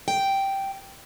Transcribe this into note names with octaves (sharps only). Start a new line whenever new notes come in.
G5